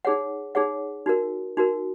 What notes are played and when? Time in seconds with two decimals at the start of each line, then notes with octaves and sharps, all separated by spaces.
0.05 D#4 G#4 C#5 F#5
0.55 D#4 G#4 C#5 F#5
1.06 D#4 F#4 A#4
1.57 D#4 F#4 A#4